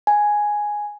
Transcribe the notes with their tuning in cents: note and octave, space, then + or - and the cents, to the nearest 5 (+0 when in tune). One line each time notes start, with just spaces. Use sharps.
G#5 +0